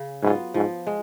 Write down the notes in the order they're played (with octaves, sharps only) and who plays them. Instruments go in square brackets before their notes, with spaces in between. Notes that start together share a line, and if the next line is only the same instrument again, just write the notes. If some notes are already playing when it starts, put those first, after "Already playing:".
Already playing: [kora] C#3
[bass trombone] G#2 [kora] F#3 B3 F4
[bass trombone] G#2 [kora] F3
[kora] G#3